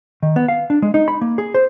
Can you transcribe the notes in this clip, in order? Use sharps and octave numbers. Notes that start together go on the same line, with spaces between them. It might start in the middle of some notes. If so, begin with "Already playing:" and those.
D#3
B3
F5
D4
G#3
D#4
B5
A#3
G#4
C5